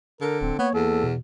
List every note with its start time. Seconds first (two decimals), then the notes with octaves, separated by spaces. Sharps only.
0.21 D3 A#4
0.41 D1 C4
0.59 A#3 B3 C#5
0.74 E2 A4
1.04 B2